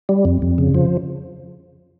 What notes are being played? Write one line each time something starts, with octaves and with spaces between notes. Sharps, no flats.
G3
F2
F2
C#3
F3